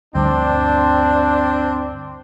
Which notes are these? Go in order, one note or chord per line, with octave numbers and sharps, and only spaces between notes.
D2 G2 C4 D4